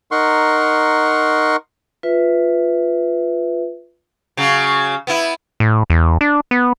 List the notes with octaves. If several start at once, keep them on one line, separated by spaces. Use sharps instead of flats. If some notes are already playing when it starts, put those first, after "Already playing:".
D#4 A#4 F#5 C6 C#6
F4 B4 E5
C#3 F#3
B3 E4
A2
E2
D4
B3